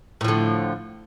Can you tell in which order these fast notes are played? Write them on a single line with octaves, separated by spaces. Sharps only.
A2 F3 D3